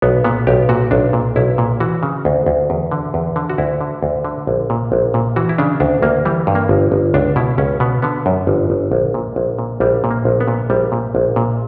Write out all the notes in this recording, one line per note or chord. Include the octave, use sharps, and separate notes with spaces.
B1 B3
A#2 B3
B1 G4
A#2 F#4
B1 D4
A#2
B1 E4
A#2
E3 F#4
C#3
D2
D2
E2
D3
E2
D3
F#4
D2 E4
D3
D2
D3
A#1
A#2
A#1
A#2
E3 F#4
E4
C#3 D4
D2 D4
D2 A#3
E3 G3
G2
A#3
G1
G1
C#2 D4
B2 E4
C#2 C#4
B2 B3
D3 B3
F#2
G1
G1
A#1
A#2
A#1
A#2
A#1 G3
A#2
A#3
A#1
B3
A#2
A#1 G3
A#2
A#1
A#2